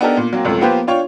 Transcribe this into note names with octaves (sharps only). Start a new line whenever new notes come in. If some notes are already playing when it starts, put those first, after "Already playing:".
B3 D4 D#4 G4 A4 A#4
A#2
F#3 A#3 C4
C#2 F#2 C3 F3 A3
F3 A#3 B3 G4 B4 C5
D4 F4 C#5 G5 C#6